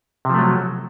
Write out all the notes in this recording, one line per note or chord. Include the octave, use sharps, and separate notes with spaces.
C3 F3 F#3 A3